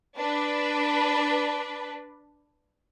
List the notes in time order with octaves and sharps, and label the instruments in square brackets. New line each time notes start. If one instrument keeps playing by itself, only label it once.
[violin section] D4 B4